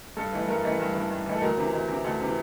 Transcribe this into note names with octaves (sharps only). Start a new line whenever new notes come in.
G2 A4
E3 A3
G2 A#4
E3 A3
G2
E3 A3
G2
E3 A3
A4
D2 A#4
C3 E3
D2
C3 E3
D2 A4
C3 E3